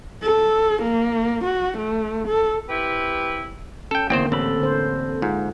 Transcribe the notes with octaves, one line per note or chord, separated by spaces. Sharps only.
A4
A#3
F#4
A3
A4
C4 E4 G4 B4
C#4 A4 G5
E2 D3 A#3 C4 C5 G5
A1 C4 A4 B5
D3 C5
G#2 F4